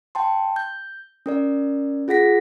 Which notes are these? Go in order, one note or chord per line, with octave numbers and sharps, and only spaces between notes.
G5 A5 C6
G6
C#4 A#4 D5
F4 G#4 F#5 A#6 B6